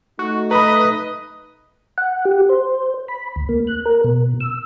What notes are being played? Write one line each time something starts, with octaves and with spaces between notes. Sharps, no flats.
A3 D#4 F#4
B4 D#5 A#5 B5
F#5
G4
C5
B5
D2
A#3
F#6
A#4
B2
E6